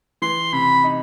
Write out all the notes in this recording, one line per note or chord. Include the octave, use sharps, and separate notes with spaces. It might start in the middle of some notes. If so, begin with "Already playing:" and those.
E3 C6
C3 B5
D#4